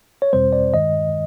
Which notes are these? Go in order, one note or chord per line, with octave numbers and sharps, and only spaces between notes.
C#5
E2 B2 G3 C4 C5
D5
G2 D#3 G#3 D#5